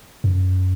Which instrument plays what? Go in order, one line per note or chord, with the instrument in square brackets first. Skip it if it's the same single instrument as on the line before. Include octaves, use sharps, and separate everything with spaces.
[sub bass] F#2